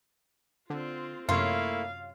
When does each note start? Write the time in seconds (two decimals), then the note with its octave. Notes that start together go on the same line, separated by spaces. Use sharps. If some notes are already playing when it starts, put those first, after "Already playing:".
0.70 D3 C4 F4
1.29 F#2 C3 A3 A#3 E4 F4 C#5 F5